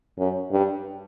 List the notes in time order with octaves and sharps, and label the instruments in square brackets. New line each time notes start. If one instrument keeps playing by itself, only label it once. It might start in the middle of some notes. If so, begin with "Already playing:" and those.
[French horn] F#2
G2